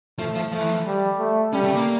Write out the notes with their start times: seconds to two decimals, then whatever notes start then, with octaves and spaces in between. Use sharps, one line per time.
0.19 F3 A3
0.35 F3
0.52 F3 A3
0.61 E3
0.69 F3
0.86 G3
1.19 A3
1.53 G3 C#4
1.65 A3
1.76 A#3